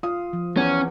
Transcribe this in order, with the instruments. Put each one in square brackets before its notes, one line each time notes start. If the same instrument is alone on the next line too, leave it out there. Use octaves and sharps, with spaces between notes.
[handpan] F4 F5 [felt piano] D#6
[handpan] F3
[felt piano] E2 [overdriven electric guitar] C#4